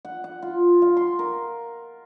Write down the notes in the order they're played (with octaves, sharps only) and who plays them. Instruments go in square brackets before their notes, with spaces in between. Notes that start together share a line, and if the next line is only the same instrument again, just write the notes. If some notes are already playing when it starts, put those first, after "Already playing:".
[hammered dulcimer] F#5
F#5
F4
F5
C6
A#4